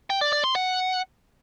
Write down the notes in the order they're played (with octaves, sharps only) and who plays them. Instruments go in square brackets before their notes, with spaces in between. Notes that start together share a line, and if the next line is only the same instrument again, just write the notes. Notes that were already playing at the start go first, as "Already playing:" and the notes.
[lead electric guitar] G5
D5
D5
C6
F#5